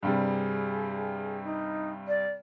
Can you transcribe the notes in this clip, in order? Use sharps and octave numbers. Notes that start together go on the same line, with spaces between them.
G2 C3 G3 G#4
D#4
D5